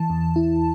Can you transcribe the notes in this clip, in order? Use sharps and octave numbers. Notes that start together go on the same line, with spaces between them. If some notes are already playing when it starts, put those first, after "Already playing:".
Already playing: E3 A5
E2
E4